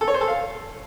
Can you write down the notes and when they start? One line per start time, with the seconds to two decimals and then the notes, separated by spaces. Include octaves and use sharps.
0.01 A4
0.08 C#5
0.14 C5
0.21 A4
0.28 F5